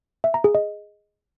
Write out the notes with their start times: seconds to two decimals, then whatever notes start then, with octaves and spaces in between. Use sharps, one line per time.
0.24 E5
0.34 A#5
0.44 G#4
0.55 D#5